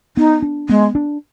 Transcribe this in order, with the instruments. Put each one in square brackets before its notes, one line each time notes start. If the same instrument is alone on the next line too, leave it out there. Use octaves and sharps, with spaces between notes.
[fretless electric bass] B3 [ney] D#4
[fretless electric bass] D4
[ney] G#3 [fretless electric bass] B3
[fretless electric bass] D4